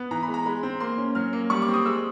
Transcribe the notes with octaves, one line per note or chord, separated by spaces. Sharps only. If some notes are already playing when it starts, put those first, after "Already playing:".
Already playing: B3
E3 A#5
B5
G#3
A#5
G#3 B5
C4
A#3 C6
C#4
F#3 F6
A#3
G3 C#6
D6
C4
D#6
G#3 E6